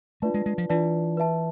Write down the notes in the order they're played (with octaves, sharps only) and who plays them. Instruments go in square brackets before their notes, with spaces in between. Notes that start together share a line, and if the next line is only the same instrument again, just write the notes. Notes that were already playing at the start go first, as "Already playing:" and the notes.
[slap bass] A3 [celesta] D4 F4 B4 D5 A5
[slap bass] G#3
G#3
F3
[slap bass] E3 [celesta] D4 F4 B4 D5 A5
[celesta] B4 E5 A5